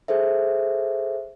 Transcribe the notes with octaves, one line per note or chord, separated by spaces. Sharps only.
G#4 A4 C5 E5